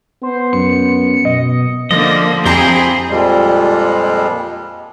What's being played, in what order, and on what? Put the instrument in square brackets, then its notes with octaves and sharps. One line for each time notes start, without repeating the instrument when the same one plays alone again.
[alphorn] B3 [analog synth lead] C5
[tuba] F#2 [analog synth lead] C#7
[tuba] B2 [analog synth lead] D#5
[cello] D3 A#3 [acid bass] F3 [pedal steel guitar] D#5
[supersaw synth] F2 G4 A#5 [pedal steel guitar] C4 E4 C5 [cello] G#4
[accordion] F2 A#2 F3 G3 G#3